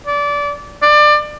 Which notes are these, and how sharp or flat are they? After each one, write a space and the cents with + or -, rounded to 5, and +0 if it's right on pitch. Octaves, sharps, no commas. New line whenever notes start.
D5 -20
D5 +25